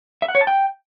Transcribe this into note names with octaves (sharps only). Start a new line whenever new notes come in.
E5
F#5
C#5
A5
G5